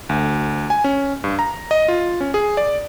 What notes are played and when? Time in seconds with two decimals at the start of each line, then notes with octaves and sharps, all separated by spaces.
0.09 D2
0.70 G#5
0.84 C#4
1.24 G2
1.39 A#5
1.71 D#5
1.88 F4
2.21 C#4
2.34 G#4
2.57 D5